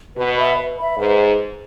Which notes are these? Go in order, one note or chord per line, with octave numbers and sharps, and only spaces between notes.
B2 B4
E5 B5
B4
E5 B5
G#2 B4